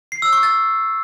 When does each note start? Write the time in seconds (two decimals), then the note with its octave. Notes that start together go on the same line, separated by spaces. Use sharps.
0.12 C7
0.22 E6
0.33 C#6
0.43 A6